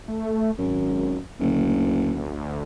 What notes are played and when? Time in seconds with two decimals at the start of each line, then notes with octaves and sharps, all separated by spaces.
0.08 A3
0.59 G#1 F#2
1.40 F#1 D2